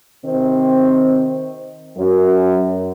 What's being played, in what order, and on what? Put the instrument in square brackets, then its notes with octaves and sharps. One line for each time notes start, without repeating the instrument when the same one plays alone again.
[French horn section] C3 D#3 C4
F#2